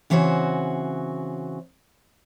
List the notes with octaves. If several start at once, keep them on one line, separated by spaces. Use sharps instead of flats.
C#3 E3 C4 F#4 C#5